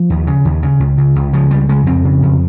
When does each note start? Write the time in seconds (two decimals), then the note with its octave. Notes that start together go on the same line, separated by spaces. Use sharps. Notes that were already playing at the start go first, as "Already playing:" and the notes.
Already playing: F3
0.10 D#2
0.27 C#3
0.45 D#2
0.63 C#3
0.80 C#2
0.98 C#3
1.16 C#2
1.33 C#3 F3
1.51 C#2 G3
1.69 C#3 G#3
1.86 F2 C4
2.04 C#3
2.22 F2